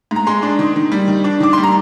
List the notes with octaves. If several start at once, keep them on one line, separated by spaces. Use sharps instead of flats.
G#2
A#5
G#3 C6
D4
D#3
D#3
G3
D#3
D4
D#3 D6
G3 C6
A#5